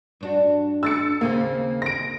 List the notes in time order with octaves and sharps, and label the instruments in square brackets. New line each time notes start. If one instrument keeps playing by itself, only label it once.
[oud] G2 D4 F#4
[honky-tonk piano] E6 A6 C#7
[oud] D#2 C#3 C4 [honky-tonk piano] A#3
[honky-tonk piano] A#6 D7